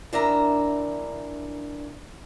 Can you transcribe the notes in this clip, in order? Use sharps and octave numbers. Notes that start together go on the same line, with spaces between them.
E3 D4 A#4 E5 A#5